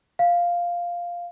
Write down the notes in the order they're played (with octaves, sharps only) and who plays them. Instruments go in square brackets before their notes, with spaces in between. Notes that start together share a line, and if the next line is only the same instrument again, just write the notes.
[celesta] F5